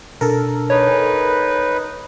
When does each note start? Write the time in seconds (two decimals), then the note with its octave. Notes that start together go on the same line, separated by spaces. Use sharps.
0.21 B2 D4 A4 A#4
0.70 D#4 B4 C#5
0.87 G#5